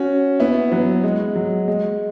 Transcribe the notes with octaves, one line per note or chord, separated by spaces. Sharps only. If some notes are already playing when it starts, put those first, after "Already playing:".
Already playing: C#4 F#4
B3 E4
F#3 B3
G#3
F#3
G#3